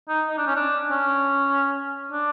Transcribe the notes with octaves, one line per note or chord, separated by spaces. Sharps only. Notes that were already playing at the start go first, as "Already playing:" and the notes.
D#4
D#4
D4
C#4
D4
C#4
D4